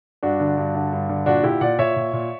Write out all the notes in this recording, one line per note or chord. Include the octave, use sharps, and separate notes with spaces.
G2 D4 F#4
D3
G2
D3
G2
D3
A#2 D4 F#4
A#2 E4 G4
A#2 D5 F#5
A#2 C#5 E5
A#2
A#2